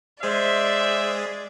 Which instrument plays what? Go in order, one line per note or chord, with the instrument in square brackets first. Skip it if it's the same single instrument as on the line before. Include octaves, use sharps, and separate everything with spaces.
[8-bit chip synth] G#3 G#4 [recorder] C5 [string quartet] D5 [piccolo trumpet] E5